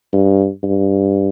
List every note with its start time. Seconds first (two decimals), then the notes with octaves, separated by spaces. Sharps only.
0.13 G2
0.63 G2